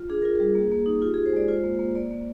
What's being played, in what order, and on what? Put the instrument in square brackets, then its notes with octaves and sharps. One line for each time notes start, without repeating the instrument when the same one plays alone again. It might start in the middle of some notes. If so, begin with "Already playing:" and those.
Already playing: [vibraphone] F4
D4 G#4
F4 A#4
G3 G#4
A#3
A#3
D#4
F4 G4
F4 G#4
C5
G#3 D5
F4 C5
A#3
A#3
A#3 D5
A#3